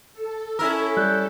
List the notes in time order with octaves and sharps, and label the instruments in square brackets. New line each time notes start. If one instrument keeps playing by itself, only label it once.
[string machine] A4
[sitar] C#4 E4 A#4 [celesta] E6
[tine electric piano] G3 [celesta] F#6 G6